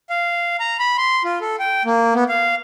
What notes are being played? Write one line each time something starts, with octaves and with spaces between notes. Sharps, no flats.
F5
A#5
B5
C6
F4
A4
G5
A#3
B3
F5